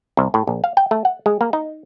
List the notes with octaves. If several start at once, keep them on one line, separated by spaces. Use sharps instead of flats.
C2
A2
A#1
F5
G5
A3
F#5
G#3
A#3
D#4